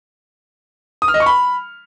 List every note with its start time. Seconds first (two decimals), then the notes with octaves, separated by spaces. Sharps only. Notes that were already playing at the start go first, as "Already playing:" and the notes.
1.02 D#6
1.08 F6
1.14 D#5
1.20 C#6
1.26 B5